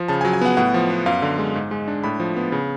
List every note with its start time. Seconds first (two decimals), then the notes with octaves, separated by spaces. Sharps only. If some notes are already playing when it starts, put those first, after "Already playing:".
Already playing: F3
0.08 C#3 A5
0.21 G#5
0.25 F#3
0.33 G#5
0.41 B3 F#5
0.57 A2 F#5
0.74 F3
0.90 B3
1.06 F#2 F5
1.22 D3
1.38 G#3
1.55 G#2
1.71 G#3
1.88 D4
2.04 A2 B5
2.20 F3
2.37 B3
2.52 C#3